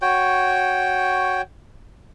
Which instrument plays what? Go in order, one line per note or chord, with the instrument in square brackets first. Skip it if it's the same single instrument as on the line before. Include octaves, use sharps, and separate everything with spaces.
[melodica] F#4 C#5 G5